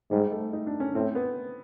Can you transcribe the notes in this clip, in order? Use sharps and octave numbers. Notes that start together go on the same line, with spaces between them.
G#2 G3
A3
D#4
D4
C#4
A2 C4
B3